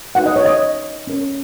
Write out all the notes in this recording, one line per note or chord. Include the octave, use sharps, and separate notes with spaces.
D#4 F#4 A#4 F#5
D#5
C#5
D#5
C#4 A#4 C#5